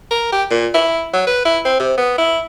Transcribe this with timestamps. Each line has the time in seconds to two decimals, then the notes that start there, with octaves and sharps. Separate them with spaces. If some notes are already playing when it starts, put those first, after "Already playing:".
0.11 A#4
0.32 G4
0.50 A#2
0.74 E4
1.13 F#3
1.27 B4
1.45 E4
1.65 C4
1.80 C3
1.98 B3
2.18 E4